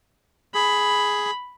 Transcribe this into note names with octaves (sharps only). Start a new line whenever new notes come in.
G#4 B5